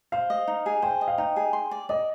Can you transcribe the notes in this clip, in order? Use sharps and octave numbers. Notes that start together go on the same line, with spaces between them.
C5 F5
D#5
D#4
G#4
C5 G5
D#5
F5
D#4 G5
G#4
C6
D5
D5 D#5